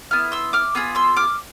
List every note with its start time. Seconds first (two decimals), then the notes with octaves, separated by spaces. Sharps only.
0.11 B3 E4 F6
0.32 C6 E6
0.53 D6 F6
0.75 B3 F4 G#4 E6
0.95 C6 E6
1.17 D6 F6